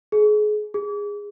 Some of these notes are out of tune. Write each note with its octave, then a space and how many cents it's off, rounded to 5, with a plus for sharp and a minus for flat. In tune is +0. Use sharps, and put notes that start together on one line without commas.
G#4 +30
G#4 -20